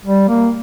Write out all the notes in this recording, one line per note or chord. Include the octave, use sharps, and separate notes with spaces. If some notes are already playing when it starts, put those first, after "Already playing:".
G3
A#3